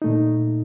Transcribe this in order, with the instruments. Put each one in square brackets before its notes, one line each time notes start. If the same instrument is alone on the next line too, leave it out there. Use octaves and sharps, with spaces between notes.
[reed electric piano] A#2 A3 D#4